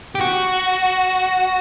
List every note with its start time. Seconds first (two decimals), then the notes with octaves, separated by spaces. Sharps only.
0.15 G4
0.21 F#4